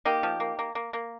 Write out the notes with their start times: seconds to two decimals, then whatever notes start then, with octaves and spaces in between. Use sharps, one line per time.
0.05 A#3 D#4 G4
0.23 F3
0.40 A#3
0.59 A#3
0.75 A#3
0.93 A#3